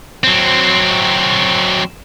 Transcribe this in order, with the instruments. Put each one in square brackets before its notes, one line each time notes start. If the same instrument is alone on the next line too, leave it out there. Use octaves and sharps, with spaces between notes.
[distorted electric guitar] F#3 C4